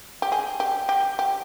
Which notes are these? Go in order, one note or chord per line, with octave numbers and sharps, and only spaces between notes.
G4
G#4
G4
G4
G4